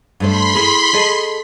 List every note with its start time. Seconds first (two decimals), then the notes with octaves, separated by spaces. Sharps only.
0.20 G2 A3 C5 B5 C6 B6
0.54 E4 G#4 A#4
0.93 G#4 A4 D#5